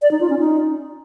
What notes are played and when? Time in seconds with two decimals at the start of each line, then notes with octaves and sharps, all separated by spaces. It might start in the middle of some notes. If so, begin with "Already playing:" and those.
0.02 D5
0.11 D#4
0.21 F4
0.30 C#4
0.39 D#4